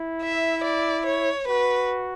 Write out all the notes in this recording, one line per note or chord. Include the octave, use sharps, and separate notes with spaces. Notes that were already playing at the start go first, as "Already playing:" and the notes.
Already playing: E4
E5
D5
C#5
F#4 B4